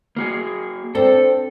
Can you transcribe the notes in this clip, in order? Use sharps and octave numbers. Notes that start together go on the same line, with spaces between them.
A#3 F#4 G#4
C4 D4 A4